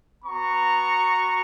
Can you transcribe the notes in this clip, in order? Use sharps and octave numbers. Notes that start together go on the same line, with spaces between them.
B3 F#4 A#5 C#6